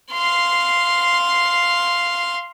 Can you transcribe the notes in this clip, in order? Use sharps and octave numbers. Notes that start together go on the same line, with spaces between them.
F5 C6